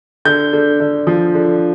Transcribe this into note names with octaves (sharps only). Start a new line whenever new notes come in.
D3 G6
D3
D3
F3
D3